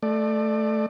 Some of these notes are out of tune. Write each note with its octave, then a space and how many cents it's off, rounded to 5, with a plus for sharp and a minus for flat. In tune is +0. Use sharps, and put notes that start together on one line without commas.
A3 -5 D5 +25